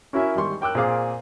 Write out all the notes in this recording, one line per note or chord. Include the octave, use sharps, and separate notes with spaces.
C#4 E4 F#4 A#4 E5 G#5
G#1 G3 C6 C#6
A#4 G5 D6 E6 F#6
A#2 C4 G#4 F5 D6